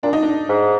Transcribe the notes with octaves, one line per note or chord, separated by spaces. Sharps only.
A#2 D4
D#4
D4
G#2